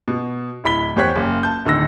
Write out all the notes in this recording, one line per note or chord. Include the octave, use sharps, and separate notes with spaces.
B2
D1 E4 B5 B6 G7
E2 G4 C5 C#5 F#6 B6
F#1
A5 G6
D1 D3 D#3 E6 A#6